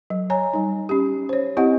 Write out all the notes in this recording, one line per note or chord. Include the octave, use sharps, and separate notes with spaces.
F#3
C#5 G#5 A#5
G3 D#4
C#4 G4
C5 C#5
C4 E4 G4 D#5 F#5